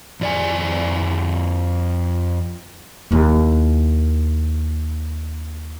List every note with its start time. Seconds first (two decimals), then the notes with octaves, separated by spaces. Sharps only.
0.21 F2 D5 G#5
3.11 D#2 E4